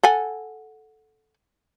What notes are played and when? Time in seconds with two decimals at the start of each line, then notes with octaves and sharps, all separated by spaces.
0.03 A4 F#5 G#5